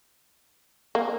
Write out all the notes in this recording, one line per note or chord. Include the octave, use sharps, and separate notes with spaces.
A#3